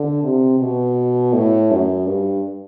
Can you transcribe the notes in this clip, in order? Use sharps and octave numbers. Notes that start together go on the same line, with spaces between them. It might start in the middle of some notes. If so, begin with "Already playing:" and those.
Already playing: D3
C3
B2
A2
F#2
G2